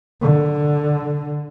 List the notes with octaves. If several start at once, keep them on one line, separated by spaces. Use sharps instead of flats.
D3